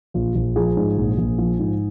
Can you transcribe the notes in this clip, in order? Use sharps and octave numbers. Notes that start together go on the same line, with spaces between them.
A#1 F4
A#1
F3 G#4
G#2
A#1
A#1
F3
G#2